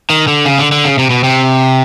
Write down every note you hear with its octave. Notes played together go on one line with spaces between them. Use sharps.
D#3
D3
C#3
D3
D3
C#3
C3
B2
C3